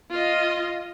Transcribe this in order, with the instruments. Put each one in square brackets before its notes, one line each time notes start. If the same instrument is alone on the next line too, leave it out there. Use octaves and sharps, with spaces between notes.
[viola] F4 D#5